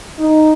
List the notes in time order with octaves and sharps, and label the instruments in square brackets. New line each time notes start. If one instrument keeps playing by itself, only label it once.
[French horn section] D#4